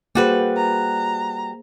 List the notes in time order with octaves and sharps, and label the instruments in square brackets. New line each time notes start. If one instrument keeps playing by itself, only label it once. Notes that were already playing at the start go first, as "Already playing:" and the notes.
[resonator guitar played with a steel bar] G3 F#4 B4 [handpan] A#3 G#4 C5
[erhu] A#5